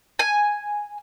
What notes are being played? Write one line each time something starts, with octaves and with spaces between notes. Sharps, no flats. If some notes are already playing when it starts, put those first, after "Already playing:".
G#5